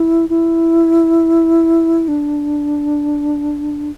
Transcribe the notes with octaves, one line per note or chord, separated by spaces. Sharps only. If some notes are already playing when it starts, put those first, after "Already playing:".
Already playing: E4
E4
D4